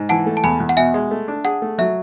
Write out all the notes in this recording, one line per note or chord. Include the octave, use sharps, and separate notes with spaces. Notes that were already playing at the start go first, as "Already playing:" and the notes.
Already playing: G#2
E3 F#5 A5
A3
A5
E2 G#5 B5
E2
F#5
B2 E5 G#5
G#3
A3
D4
G#4 F#5
A3
F#3 E5